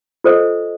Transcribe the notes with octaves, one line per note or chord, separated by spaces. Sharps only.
F4 A4 C5 D#5